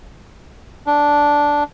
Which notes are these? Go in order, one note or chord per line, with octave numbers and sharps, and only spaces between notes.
D4